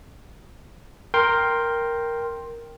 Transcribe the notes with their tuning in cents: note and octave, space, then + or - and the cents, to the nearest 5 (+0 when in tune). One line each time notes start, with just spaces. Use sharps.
A#4 +0 G5 +0 C6 +10